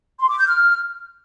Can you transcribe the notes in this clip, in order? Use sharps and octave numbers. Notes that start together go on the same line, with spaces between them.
C6
D6
G6
F6